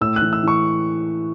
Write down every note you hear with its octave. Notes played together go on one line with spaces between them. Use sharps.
A2 E6
F#6
E3
E6
E3 C#6